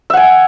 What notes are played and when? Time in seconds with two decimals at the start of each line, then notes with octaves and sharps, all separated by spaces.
0.10 E5
0.13 F#5
0.17 G#5